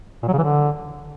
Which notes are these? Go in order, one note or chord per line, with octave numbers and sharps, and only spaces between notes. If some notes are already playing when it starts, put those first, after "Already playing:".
A#2
F#3
C#3
E3
D3